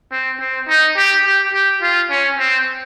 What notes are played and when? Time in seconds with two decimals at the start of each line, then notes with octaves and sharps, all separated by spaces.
0.12 C4
0.40 C4
0.68 D#4
0.97 G4
1.25 G4
1.54 G4
1.82 F4
2.10 C#4
2.39 C4